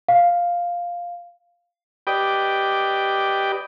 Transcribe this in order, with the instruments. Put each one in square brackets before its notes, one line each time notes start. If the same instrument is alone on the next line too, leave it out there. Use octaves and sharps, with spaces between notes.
[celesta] F5
[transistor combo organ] G4 B4 D5 D#5 G5